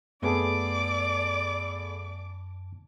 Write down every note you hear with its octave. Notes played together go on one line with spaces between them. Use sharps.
F#2 A3 B3 G#4 D5 A5 D6